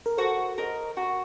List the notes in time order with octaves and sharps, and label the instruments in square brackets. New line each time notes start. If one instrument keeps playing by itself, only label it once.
[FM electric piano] A#4
[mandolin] F#4 [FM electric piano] A4 C5
[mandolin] A#4 D#5
F#4